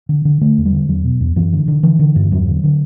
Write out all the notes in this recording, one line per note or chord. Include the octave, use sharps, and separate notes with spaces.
D3
D3
D3 A3
E2
G3
D3
E2 F#3
B2
E2
F#2 E3
D3
D3
D3 E3
D3
G2
E2 F#3
D3
D3